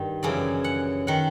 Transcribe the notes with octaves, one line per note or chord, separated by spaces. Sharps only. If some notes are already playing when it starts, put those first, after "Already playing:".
Already playing: G2 D#3
F#2 C#3 E3 D5
F#5
D#3 F#5